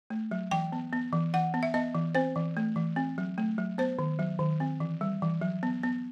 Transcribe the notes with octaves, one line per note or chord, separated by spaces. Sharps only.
A3
F#3
E3 G5
B3
B3
E3
E3 F#5
B3
E5
B3 D#5
E3
C4 C5
E3
A3
E3
C4
F#3
A3
F#3
B3 C5
D#3
F#3
D#3
C4
E3
G3
E3
F#3
B3
B3